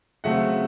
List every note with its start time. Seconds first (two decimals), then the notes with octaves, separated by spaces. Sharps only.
0.24 C#3 F#3 A3 C4 E5 F#5